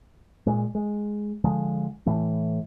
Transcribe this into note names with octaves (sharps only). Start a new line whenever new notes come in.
A#2 G#3
G#3
D3 F3 G#3
A2 E3 A3